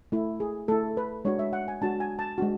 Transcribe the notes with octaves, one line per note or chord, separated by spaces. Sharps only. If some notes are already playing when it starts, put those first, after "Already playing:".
A3 E4
G#4
A3 E4 A4
B4
G#3 D4 F#4 C#5
E5
F#5
G#5
G#3 D4 F#4 A5
G#5
A5
G#3 D4 F#4